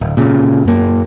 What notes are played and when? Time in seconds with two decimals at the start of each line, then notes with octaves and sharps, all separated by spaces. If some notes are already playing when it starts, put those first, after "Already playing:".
0.01 D1
0.17 A#2 C#3
0.65 F#2 A#3